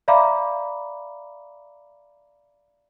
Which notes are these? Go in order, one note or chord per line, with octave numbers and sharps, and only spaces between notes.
D5 E5 F5 A#5 B5 D6